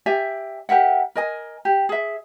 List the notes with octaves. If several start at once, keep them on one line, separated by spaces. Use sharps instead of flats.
G4 D5 E5 G#5
G4 A#4 E5 F#5
A#4 D#5 G#5
G4
G#4 E5